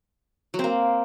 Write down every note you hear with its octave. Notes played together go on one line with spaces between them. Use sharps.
F#3
C4
A#3